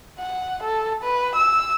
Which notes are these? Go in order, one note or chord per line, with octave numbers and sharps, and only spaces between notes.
F#5
A4
B4
E6